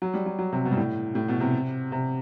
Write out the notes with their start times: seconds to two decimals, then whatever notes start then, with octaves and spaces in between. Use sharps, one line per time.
0.02 F#3
0.14 G3
0.26 F#3
0.39 F#3
0.52 C3
0.65 B2
0.71 G2
0.77 A2
1.15 A2
1.28 B2
1.40 C3
1.92 C3